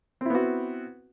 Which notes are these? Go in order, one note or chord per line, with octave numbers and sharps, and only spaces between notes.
B3 C4 E4 F#4